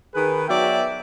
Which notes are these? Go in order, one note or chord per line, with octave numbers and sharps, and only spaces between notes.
D#3 G#4 B4
F#3 B3 D5 E5 G5